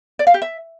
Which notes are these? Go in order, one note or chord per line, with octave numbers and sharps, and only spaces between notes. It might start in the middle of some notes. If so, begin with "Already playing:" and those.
D5
F5
G4
E5